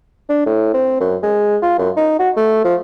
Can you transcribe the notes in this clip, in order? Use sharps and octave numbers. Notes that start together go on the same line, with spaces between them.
D4
A2
C4
F#2
G#3
F4
F#2
D#4
F#4
A3
F3